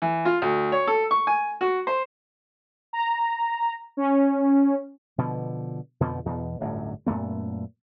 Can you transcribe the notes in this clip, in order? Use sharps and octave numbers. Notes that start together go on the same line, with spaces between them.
E3
F4
D2
C#5
A4
C#6
G#5
F#4
C5
A#5
C#4
B2 D3 F3
F2 B2 D3 F3
E2 B2
D1 G1 F#2 A2
F#2 A#2 A3 B3